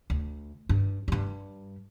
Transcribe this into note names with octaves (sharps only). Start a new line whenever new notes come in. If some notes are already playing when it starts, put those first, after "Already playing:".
D2
G2
G2 G3